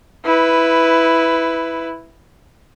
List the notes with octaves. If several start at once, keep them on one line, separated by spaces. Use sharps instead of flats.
E4 B4